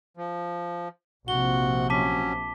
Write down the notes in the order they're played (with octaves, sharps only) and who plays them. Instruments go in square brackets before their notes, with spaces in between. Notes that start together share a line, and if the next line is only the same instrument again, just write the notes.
[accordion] F3
[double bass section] A#1 C3 F3 [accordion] F#4 F#5 [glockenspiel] G7
[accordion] F#3 C#4 [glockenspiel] A5 D6 B6